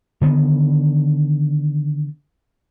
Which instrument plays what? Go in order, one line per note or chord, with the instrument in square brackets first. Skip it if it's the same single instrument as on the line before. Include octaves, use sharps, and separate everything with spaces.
[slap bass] D3 D#3 B3